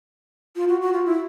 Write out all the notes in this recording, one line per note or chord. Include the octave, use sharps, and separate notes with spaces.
F4
F#4
F#4
F4
E4